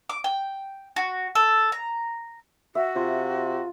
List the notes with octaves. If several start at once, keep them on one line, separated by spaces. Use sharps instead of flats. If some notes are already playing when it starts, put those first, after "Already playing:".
D6
G5
F#4
A4
A#5
F#4 E5
C3 F4